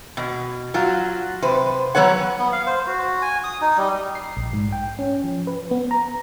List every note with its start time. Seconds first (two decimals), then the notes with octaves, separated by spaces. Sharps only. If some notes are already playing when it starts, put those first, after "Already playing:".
0.17 B2
0.74 F#3 F4 F#4
1.42 C3 B4 C5
1.95 F#3 B3 B4 C#5 F#5
2.39 B3
2.52 F5
2.67 C5
2.87 F#4
3.22 G#5
3.44 D#6
3.61 D#4
3.77 G3
4.15 C7
4.37 A#1
4.53 G#2
4.72 G5
4.99 C#4
5.24 F3
5.47 B4
5.71 B3
5.91 A#5